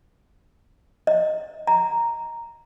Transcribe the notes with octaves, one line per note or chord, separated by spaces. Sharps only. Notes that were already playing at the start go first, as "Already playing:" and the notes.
D#5
A#5